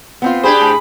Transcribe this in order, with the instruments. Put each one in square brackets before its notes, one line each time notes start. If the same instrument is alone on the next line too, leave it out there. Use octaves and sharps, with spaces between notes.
[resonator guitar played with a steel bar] B3 C4 F4
[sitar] D4 G4 C5 [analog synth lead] G#4 [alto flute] B5
[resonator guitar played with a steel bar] A2